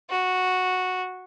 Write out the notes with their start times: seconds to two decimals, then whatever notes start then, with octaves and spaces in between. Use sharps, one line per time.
0.10 F#4